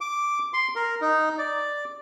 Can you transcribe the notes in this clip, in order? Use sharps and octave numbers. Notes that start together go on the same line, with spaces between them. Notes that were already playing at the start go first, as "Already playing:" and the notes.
D6
C6
A#4
D#4
D5